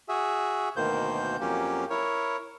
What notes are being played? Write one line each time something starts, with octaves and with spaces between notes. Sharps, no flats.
F#4 G#4 E5
D2 B2 D#3 A#3 C5 G6
F2 F#3 A#3 C#4 G4
E4 A#4 C#5